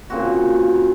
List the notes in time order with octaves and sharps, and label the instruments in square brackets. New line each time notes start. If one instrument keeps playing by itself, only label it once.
[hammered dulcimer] A#2 C#3 C4 F#4